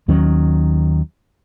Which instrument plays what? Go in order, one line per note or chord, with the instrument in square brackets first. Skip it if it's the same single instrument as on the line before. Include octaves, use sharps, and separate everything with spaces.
[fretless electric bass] D#2 D#3 F#3 C#4